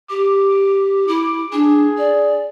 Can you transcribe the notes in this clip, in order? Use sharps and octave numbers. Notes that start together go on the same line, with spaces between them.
G4 D6
E4 D6
D4 G#4
D5